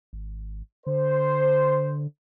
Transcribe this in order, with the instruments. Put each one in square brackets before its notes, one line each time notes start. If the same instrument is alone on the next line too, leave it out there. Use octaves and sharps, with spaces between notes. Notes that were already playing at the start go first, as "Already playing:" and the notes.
[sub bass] G#1
[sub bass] D3 [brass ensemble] C5